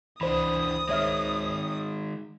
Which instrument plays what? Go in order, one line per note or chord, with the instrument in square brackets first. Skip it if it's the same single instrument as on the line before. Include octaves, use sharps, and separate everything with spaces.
[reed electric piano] C#2 C5 B5 [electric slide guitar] E3 D4 [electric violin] D#6
[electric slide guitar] D#3 G#3 [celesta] C#5 E5 F6